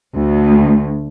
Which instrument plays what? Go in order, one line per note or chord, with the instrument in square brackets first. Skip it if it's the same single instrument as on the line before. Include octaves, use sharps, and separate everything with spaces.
[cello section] D2